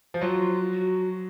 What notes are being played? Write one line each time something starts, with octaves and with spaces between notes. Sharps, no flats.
F3
F#3 F4
F#4